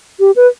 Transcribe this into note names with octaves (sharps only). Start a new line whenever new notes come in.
G4
B4